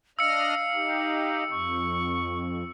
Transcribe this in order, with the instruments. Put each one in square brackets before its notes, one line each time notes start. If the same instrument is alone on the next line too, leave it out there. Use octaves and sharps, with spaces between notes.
[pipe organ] D4 D#5 F6 [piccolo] F5 [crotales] E6 C#7
[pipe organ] D#4 G4
[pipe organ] F2 [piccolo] C#6